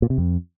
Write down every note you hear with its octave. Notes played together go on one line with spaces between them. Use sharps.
A#2
C3
F2